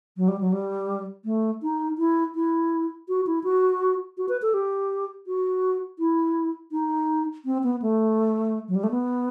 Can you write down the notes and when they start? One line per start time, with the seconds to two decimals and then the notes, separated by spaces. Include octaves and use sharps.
0.17 F#3
0.28 G3
0.41 F#3
0.52 G3
1.25 A3
1.63 D#4
1.98 E4
2.35 E4
3.08 F#4
3.27 E4
3.44 F#4
4.18 F#4
4.29 B4
4.42 A4
4.54 G4
5.27 F#4
5.99 E4
6.72 D#4
7.45 C4
7.63 B3
7.82 A3
8.68 F#3
8.75 G3
8.84 A3
8.91 B3